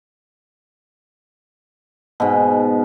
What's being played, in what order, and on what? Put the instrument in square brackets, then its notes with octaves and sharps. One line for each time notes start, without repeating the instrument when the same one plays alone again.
[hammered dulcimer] G#2 B2